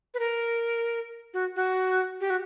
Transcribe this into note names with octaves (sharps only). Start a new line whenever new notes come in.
B4
A#4
F#4
F#4
G4
F#4